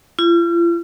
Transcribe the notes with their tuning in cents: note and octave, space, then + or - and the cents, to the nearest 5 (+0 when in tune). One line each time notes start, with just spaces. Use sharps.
F4 -45